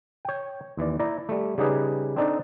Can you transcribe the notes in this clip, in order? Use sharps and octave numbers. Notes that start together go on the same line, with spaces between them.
C#5 G5
D#2 E3 D5
E4 D5 A#5
G3 A3
C#3 G3 D#4 G4 G#4 B4
C4 D4 D#4 A4 D5